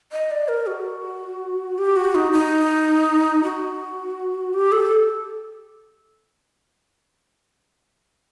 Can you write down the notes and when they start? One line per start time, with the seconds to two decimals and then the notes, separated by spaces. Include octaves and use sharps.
0.12 D#5
0.31 D5
0.48 A#4
0.67 F#4
1.78 G4
1.96 F#4
2.15 D#4
2.32 D#4
3.44 F#4
4.54 G4
4.72 A4